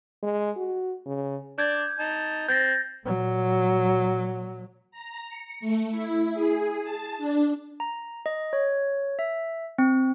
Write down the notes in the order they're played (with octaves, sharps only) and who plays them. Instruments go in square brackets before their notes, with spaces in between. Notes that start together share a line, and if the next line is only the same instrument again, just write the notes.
[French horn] G#3
F#4
C#3
[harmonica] D4 D5 [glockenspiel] G6 G#6
[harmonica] D#4 A5
[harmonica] C4 [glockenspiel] G6 A6 A#6
[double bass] A#2 F#3
[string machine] A#5
C#7
A3
E4
G#4
A5
D4
[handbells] A#5
D#5
C#5
E5
C4